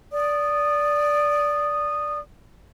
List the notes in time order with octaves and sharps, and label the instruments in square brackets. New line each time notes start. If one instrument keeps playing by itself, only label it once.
[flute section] D5 D#6